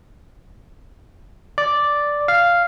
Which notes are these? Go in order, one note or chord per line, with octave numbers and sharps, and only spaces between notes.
D5
F5